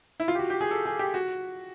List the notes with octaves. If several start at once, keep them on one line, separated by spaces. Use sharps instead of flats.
E4
F4
G4
F#4
G4
G#4
A4
G#4
G4
F#4